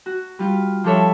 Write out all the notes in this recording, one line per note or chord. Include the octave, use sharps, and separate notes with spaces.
F#4
G3 F4
F3 G3 D4 A4 C#5 E5